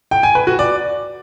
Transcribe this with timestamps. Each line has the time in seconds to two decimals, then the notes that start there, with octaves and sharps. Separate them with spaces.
0.11 G5
0.23 G#5
0.35 B4
0.47 F#4
0.59 D5